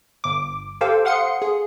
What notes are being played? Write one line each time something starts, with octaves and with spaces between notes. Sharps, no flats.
G1 D6
G4 A4 C5 F5 G5
F5 F#5 C6 D#6 C#7
G#4